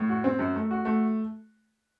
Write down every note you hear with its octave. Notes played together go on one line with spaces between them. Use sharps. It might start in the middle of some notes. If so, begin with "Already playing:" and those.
Already playing: A2
F#4
C4
F#2
A3
F#4
A3